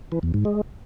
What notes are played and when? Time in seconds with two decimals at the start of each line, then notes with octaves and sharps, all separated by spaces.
0.12 E3
0.23 E2
0.34 G#2
0.45 G#3